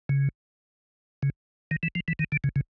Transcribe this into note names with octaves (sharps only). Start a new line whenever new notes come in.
C#3
C#3
D#3
E3
F3
E3
D#3
D3
C#3
C#3